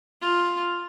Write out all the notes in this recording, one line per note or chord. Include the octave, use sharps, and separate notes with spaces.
F4